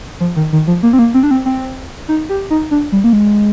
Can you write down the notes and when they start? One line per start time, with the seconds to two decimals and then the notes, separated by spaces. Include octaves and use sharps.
0.20 F3
0.36 D#3
0.53 D#3
0.67 F3
0.83 A#3
0.93 C4
0.99 A#3
1.14 C4
1.23 D4
1.31 C4
1.46 C4
2.08 D#4
2.29 G4
2.50 D#4
2.71 D4
2.92 G3
3.04 A#3
3.13 G#3